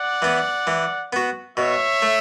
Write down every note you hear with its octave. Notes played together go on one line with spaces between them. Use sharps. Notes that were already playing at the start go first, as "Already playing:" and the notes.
Already playing: D5 F#5
E3 B3
E3
B3 F#4
B2 C#5 E5
A3